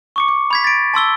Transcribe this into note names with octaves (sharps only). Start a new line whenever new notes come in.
C#6 D6 C#7
D6
B5 G#6 B6
A6 D7
A5 C6 E6 G7